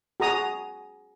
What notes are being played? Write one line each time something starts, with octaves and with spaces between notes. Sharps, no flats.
F#4 G#4 A#5 D#6